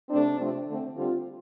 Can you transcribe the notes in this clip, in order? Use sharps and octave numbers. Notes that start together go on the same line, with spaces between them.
C3 A3 C4 D4
C3 F3 A3 C4
D3 A3 C4
D3 G3 C4 F4